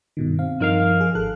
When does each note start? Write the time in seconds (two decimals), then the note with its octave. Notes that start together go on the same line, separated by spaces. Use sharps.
0.17 G2 B2 D#3
0.39 C4 F5
0.60 G2 F3 D#4 A#4 F5
1.01 G#4
1.15 G#1 A4 F#6